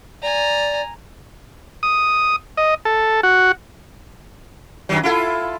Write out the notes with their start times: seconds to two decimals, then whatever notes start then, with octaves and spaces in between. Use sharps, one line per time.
0.22 D5 G#5 A#5
1.83 D#6
2.57 D#5
2.85 A4
3.23 F#4
4.89 F#2 D#3 F#3
5.03 E4 F4 A4